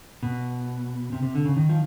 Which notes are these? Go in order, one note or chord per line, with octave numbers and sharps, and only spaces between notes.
B2
C3
C3
D3
C#3
D#3
F3